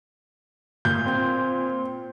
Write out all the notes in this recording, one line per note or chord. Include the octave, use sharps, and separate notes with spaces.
A#2 G6
C4